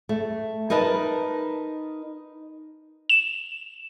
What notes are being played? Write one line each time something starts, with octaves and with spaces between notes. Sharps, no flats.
A3
D#4 A#4 B4 D#5 A5
E7